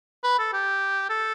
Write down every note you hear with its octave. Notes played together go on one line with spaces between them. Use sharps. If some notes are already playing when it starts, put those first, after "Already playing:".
B4
A4
G4
A4